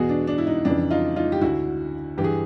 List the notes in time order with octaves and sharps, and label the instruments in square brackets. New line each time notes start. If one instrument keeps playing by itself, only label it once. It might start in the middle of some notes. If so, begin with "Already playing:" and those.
Already playing: [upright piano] E2 B2 F#4 G#4
D4
D4
E4
D#4
F2 C#3 E3 D4
D#4 F4
D#4 F4
G4
D2 D3 E4 F#4
G2 E3 G4
G#4